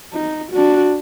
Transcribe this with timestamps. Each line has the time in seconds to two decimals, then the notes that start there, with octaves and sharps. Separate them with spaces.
0.13 D#4
0.52 D4 F#4